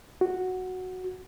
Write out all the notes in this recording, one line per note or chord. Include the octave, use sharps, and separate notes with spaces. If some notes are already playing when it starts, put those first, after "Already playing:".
F#4